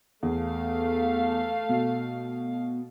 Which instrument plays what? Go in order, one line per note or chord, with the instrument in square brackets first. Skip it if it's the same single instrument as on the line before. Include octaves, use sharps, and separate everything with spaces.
[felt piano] E2 [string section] A3 F5
[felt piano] B2